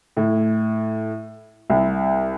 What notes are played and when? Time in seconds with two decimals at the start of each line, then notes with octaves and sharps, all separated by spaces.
0.17 A2
1.70 C2